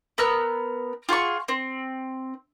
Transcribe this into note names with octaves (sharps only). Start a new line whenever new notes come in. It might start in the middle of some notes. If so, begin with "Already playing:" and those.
B3 A#4 E6 F#6
F4 G#4 F#5 C#6
C4